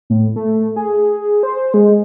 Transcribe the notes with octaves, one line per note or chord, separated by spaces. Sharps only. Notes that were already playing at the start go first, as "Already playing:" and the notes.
A2
A3
G#4
C5
G#3